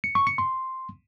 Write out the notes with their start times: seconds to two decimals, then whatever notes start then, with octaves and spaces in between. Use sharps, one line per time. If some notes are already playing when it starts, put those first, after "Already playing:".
0.04 C#7
0.15 C#6
0.27 C#7
0.38 C6